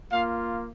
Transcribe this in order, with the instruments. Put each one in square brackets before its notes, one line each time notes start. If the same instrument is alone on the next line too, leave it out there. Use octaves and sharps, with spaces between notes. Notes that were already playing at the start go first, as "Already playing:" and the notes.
[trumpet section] A#3 F4 F5